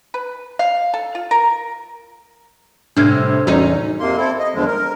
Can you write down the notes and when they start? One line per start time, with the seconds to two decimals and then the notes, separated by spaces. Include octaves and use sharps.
0.14 B4
0.59 F5
0.94 A4
1.15 F4
1.31 A#4
2.97 A2 C3 D4 F6 G#6
3.47 E2 C#4 D#4 F#4
4.00 F2 C3 A#3 C6
4.17 C4 E4 A4
4.39 D#5
4.55 E2 G2 D3 F3 G#3
4.67 A#4